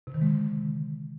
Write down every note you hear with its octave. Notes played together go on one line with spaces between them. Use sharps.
C3
D#3
G#3
D3